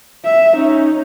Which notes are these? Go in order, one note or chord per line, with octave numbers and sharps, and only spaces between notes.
E5
C#4 D#4